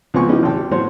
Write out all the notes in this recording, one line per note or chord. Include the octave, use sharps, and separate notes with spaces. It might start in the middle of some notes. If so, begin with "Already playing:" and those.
C#2 F3 B3 C4 G#5 C#6
E3 B3 C#4 D#4 E4 G4
G#1 C3 G#3 G5 A5
G4
A2 E3 F#3 C5 C#5 C6